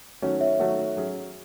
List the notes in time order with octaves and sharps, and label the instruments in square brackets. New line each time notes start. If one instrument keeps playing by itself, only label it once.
[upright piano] D#3 F#3 A3 C#4 F#4 [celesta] C#5
[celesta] C#5 E5
[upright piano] D#3 F#3 A3 C#4 F#4
F#3 C#4 G#4